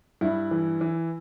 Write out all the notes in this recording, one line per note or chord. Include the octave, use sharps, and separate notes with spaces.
G2 E4
E3
E3